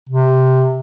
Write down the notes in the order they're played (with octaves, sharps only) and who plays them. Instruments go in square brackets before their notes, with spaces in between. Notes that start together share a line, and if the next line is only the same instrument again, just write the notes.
[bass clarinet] C3